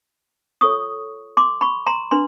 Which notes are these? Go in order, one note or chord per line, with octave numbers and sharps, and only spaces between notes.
F4 A4 C#5 C#6 D#6
C6 D6
B5 C#6
A#5 C6
D4 B4 C6